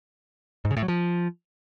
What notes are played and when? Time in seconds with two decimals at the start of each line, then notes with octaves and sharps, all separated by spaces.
0.65 G#2
0.71 C#3
0.77 A2
0.82 F#3
0.88 F3